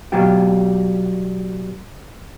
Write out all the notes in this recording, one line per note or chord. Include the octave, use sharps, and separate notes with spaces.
B2 F#3 G3 F4 G4